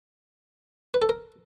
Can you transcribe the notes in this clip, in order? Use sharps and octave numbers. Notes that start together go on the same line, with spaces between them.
B4
A4
A#4